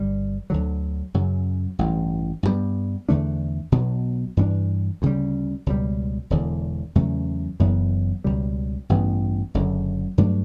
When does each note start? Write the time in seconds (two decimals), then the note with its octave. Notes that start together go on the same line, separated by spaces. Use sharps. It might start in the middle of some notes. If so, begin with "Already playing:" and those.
Already playing: G1 G2 G3
0.50 D2 D3 F#3
1.14 F#2 C#3 F#3
1.79 A1 G2 E3
2.43 G2 D3 G3 B3
3.09 E2 D3 A3 D4
3.72 B1 B2 F#3 B3
4.37 G2 E3 A3 D4
5.02 D2 C#3 G3
5.66 C#2 B2 G3
6.30 E1 E2 D3
6.95 E2 C#3 F#3 A3
7.60 F#1 F#2 E3 B3
8.24 C#2 B2 G3
8.89 A1 G2 E3 B3
9.54 F#1 F#2 D3
10.18 G2 F#3 A3 D4